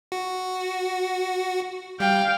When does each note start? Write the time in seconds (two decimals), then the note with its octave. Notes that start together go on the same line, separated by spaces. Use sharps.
0.12 F#4
2.00 G3 F5 G5